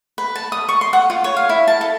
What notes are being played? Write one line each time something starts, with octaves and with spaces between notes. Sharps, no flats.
B4
A5
D#6
C#6
C6
F#5
F4
C#5
F5
E4
A5
A4